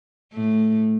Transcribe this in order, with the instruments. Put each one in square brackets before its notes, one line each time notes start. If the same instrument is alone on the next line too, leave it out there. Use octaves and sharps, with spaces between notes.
[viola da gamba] A2 A3